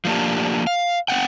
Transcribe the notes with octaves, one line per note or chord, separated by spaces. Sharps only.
F3 A3 A#3 D4 G4
F5
B3 C4 F#5 G5